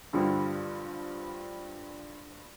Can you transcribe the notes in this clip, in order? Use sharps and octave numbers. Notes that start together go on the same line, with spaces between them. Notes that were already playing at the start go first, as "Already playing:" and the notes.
G2 D3 F3 G3